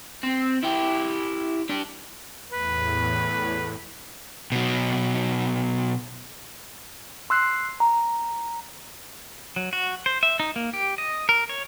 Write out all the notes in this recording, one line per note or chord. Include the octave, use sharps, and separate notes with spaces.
C4
E4 G4
D4 G4
E2 A2 B4
B2 F#3
C6 E6 F#6 C7
A#5
F#3
F#4
C5
E5
D#4
A#3
G4
D#5
A#4
C#5